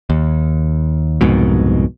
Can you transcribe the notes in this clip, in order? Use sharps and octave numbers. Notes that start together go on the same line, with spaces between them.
D#2
C2 F2 G#2 B2